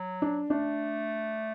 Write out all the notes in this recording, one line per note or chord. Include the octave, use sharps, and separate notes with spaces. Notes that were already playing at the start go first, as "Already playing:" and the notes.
Already playing: F#3
D4
A3 D4